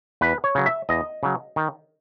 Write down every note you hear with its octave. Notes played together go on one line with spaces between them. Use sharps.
E2 B4
C#5
C#3 F#3
E5
E2 D#5
C#3 F#3
D#3